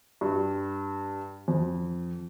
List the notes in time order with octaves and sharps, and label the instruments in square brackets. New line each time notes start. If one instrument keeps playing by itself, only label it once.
[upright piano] G2
F2